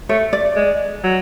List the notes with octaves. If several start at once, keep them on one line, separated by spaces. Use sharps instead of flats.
A3 C#5
D5
G#3
F#3